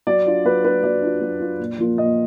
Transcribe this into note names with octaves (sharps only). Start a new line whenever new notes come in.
F#3 D5
D4 F4
F#3 B4
D4 F4 B4
F#3 D5
D4 F4
F#3
D4 F4
A#2
F3 A#3 F4
A#2 D#5